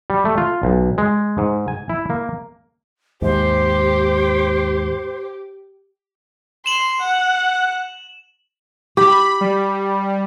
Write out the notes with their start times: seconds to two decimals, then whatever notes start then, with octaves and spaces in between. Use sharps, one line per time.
0.10 G3
0.25 A3
0.38 F4
0.63 B1
0.98 G#3
1.38 G#2
1.68 G#5
1.90 E4
2.10 A#3
3.22 D#2 G#2 G4 C5
6.66 C6 E7 F#7
7.00 F#5
8.97 G4 B5
9.41 G3